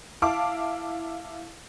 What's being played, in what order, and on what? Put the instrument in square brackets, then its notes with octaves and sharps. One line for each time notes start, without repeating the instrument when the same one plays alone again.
[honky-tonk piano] E4 F5 A5 D6